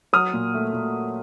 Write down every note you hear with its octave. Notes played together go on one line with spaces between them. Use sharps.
F#3 D#6 F6
A#2
A3
A#2